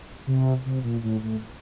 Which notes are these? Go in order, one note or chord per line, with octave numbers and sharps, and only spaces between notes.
C3
C3
A#2
A2
A2